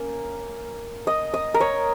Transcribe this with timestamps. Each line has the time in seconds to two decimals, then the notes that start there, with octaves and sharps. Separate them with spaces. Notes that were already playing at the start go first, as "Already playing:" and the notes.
Already playing: A#3 C#4
1.07 D#5
1.34 D#5
1.54 A#4
1.60 C#5